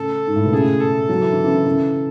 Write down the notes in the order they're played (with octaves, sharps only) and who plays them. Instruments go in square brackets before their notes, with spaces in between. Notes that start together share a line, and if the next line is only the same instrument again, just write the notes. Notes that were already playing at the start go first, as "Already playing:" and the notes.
Already playing: [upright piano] A2 C#3 [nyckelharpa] A4
[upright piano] G#2
A2
B2
[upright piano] A2 C#3 [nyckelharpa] G#4
[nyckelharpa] A4
[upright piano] F#3
E3
D3
C#3 E3
C#3 E3